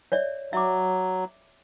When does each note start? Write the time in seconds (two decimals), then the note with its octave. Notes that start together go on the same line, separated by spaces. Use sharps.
0.12 C#5 D5 E5
0.53 F#3 E5 D6